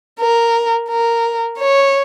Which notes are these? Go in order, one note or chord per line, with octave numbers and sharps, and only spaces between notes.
A#4
A#4
C#5